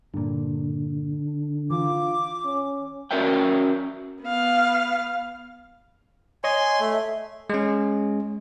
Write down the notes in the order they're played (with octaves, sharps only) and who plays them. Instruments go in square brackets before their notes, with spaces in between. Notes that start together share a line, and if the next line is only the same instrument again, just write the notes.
[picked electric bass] G2 A#2 [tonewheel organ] D3
[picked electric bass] E3 [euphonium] F4 [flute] D6
[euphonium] C#4
[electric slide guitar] C#4 F#4 A#4 D5 E5 G5
[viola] B3 F5
[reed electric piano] C#5 D#5 [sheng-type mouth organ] G#5 C6
[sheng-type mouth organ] A3 [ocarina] E5
[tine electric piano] G#3 C#4